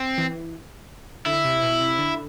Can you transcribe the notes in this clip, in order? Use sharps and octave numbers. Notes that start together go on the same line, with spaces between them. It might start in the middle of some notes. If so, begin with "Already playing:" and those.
Already playing: C4
E3
D3 E4
C3
B2
C3
D3